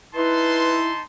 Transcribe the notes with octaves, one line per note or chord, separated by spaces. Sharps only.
D#4 E4 B4 A5 C6